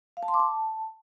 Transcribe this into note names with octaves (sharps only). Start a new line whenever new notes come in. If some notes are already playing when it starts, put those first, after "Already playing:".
F5
A5
C6
D6
A5